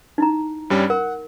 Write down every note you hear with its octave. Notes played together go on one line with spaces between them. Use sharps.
D#4 E4 A#5
G2 G3 C#4
A#4 F#5